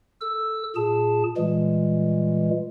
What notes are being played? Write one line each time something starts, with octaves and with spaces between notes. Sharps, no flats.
A4 E6
A#2 G#4 A5
A#2 E3 G3 G#3